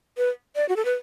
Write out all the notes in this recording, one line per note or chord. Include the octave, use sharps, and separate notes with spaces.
B4
D5
F#4
A4
B4